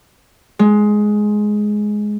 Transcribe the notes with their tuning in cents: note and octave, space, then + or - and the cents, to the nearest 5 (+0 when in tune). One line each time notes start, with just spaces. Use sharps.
G#3 +10